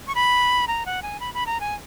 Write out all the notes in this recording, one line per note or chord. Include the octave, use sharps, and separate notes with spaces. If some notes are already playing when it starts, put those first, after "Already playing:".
C#6
B5
A#5
F#5
G#5
B5
B5
A#5
G#5